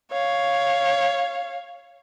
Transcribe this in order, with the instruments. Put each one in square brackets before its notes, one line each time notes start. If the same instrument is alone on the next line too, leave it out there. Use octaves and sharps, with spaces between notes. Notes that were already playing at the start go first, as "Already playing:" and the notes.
[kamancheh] C#5 F5